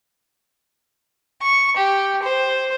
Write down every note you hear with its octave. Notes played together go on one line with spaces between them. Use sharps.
C#6
G4
C5